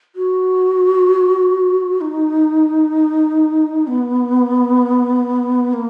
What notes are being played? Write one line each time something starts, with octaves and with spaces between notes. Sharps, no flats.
F#4
D#4
B3
A#3